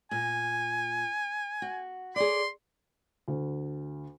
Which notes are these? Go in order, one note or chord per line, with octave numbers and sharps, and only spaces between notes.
A#2 G#5
F#4
G#4 C#5 D5 C6
D2